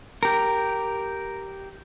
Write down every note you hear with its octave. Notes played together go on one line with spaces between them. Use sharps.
G4 A#4